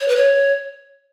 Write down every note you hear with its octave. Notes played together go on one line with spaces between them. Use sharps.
C#5
B4
C#5